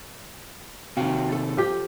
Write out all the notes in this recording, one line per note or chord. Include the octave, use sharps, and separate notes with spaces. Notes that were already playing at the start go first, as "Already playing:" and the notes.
C3 D#3 F#4 F5 G5
A4
F3 G4